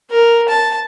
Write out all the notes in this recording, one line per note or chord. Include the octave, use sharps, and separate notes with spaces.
A#4
A5